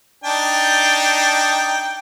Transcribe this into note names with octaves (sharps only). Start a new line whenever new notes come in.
D4 D#4 G5